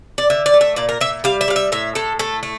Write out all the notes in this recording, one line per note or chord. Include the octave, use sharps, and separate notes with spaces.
D5
D3 E5
D5
A3
E5
A#2 D5
A#4
A#2 E5
G3 F5
E5
G3 F5
E5
A2 E5
A2 A4
A3 A4
A3